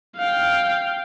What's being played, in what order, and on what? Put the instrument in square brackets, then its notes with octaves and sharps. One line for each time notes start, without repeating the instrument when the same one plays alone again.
[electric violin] F5 G5